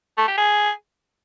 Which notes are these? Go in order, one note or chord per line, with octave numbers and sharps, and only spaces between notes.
A3
G4
G#4